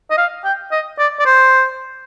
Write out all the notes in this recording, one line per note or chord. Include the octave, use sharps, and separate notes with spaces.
D#5
F5
G5
D#5
D5
D5
C5